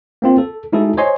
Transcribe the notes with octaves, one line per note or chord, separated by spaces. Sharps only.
A#3 C4 F4
A4
G#3 D#4 E4 F#4 G#4 A4
C5 C#5 D#5 G#5 C6